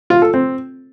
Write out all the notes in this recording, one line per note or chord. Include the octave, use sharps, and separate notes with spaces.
F4
A4
C4